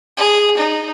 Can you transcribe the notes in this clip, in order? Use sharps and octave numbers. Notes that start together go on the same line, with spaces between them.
G#4
D#4